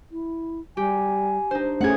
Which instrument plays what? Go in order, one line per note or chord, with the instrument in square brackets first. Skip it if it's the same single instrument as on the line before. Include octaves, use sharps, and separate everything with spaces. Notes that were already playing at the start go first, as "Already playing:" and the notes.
[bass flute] E4
[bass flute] G3 [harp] G4 [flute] G#5
[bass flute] D4 [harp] D#4 C5
[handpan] A3 C#4 G#4 [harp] F#5 G#6